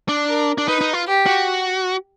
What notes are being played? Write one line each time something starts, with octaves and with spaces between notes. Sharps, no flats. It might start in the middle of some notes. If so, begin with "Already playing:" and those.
D4
A#4
D4
D#4 B4
D#4
F4
G4
F#4